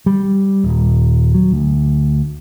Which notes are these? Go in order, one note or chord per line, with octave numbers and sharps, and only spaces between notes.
G3
D#1
F#3
D2